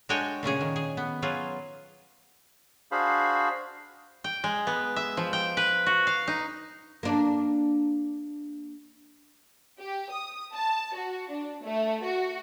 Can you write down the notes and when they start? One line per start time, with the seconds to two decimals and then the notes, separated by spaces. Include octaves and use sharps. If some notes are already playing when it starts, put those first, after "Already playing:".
0.09 G#3 D4 F#4 C#5 G5 G#5
0.43 A#2 C#3 C#4 G#4
0.61 D#3
0.76 G#4
0.97 B3
1.22 F#3 F4 G#4
2.92 D4 F#4 G#4 C5 F5 B5
4.24 G5
4.44 G#3
4.67 B3
4.96 E5
5.17 F3
5.33 G5
5.57 B4
5.86 F#4
6.07 F5
6.28 D#4
7.03 A#3 D4
9.79 G4
10.11 D#6
10.54 A5
10.94 F#4
11.30 D4
11.63 A3
12.04 F#4